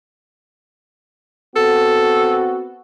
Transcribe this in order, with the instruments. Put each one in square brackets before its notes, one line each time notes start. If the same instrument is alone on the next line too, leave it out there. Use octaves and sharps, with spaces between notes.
[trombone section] B3 C4 F#4 [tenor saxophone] A4